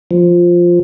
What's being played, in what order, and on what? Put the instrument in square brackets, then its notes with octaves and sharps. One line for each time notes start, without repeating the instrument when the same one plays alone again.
[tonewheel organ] F3